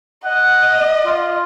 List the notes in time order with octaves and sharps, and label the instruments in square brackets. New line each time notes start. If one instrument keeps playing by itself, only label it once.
[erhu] D#5 [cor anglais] F#5
[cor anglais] F4